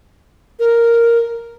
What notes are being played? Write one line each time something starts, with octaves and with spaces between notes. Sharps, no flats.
A#4